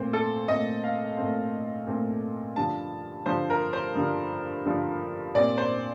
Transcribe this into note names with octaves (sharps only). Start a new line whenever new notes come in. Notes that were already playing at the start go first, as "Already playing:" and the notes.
Already playing: A#2 A3 C4 C5
A4
A#2 A3 C4 D#5
F5
A#2 A3 C4
A#2 A3 C4
G2 D3 F3 A5
G2 D3 F3 C5
A#4
C5
G2 D3 F3
G2 D3 F3
A#2 G3 C4 D5
C5